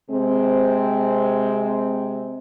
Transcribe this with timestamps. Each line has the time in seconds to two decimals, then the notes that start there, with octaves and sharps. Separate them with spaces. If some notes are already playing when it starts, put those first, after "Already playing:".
0.11 C3 G#3 C4